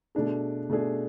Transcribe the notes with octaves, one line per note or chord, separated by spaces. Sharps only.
B2 A3 D4 G#4
B2 A3 D4 G#4